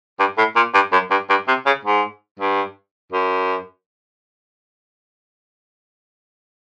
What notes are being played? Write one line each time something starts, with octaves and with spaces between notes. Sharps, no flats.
G2
A2
A#2
G2
F#2
G2
G2
C3
C#3
G#2
G2
F#2